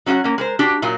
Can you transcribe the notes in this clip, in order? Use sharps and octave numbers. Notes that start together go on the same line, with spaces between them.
F#3 C#4 F#4 C#5 F#5
A#3 C#4
G#3 A#4 C5
D4 F#4 G4
A#2 F#3 A#3 F4